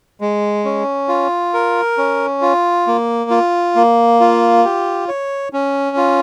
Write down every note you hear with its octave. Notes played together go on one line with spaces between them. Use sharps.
G#3
C#4
F4
A#4
C#4
F4
A#3
F4
A#3
F4
G4
C#5
C#4
F4